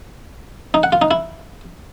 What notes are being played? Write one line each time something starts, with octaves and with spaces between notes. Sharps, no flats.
D#4
F#5
F4
D#4
E4